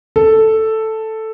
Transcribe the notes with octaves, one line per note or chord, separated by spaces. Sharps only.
A4